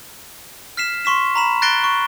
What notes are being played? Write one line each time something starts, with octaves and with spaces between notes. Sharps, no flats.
F6 B6 C7 E7
C6 C#6 B6 E7
A#5 B5 E7
F#6 A6 A#6 C7 D7 G7
C#6